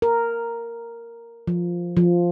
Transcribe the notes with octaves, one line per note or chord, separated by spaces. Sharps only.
A#4
F3
F3